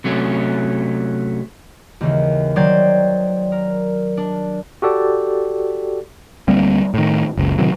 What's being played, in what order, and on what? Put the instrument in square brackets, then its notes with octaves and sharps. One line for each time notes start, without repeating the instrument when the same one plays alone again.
[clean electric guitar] C3 F#3 A3 C#4
[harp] D#2 C#3 E3
D#3 F#3 C5 D5 G5 G#6
A#4
D4
[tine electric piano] F#4 G4 A4 D5
[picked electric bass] D2 G3 A#3 C4
A2 D#3
F#1 C#2
A2 C3 D#3 F#3